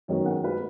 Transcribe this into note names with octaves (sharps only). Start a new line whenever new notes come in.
F#2 D#3 G#3 B3 C#5
F#5
B4